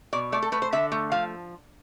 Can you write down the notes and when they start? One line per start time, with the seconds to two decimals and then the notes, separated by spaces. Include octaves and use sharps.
0.13 B2 D5
0.32 A3 D5
0.43 A4
0.52 A3 B4
0.62 C5
0.73 D3 E5
0.92 A3
1.12 F3 F5